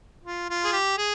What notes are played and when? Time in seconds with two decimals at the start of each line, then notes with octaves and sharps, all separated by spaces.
0.24 F4
0.49 F4
0.65 G#4
0.73 G4
0.98 G#4